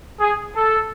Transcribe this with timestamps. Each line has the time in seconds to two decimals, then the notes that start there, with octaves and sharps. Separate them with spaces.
0.20 G#4
0.56 A4